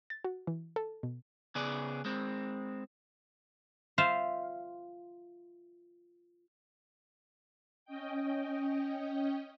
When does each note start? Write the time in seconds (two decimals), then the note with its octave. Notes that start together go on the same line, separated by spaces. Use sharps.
0.10 A6
0.25 F#4
0.47 E3
0.76 A4
1.03 B2
1.55 C#3 B3 G#4 D5
2.05 G#3 C4
3.98 F4 C5 E5 F5
7.85 C#4 D#5 G5